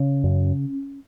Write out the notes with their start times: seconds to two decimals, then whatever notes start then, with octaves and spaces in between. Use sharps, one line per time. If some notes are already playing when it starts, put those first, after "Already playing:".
Already playing: C#3 C#4
0.24 F#2